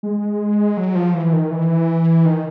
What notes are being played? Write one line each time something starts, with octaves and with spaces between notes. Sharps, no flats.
G#3
F#3
F3
E3
D#3
E3
D#3